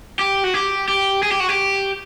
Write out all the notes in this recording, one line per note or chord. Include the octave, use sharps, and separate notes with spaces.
G4
F#4
G4
G4
G#4
G4
F#4
G4